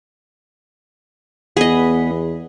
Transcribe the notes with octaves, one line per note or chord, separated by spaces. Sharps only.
E2 B3 G#4 D#5